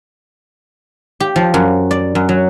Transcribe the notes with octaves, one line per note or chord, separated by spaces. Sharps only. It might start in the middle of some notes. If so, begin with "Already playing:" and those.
G4
F3
F#2
D5
F#2
F#3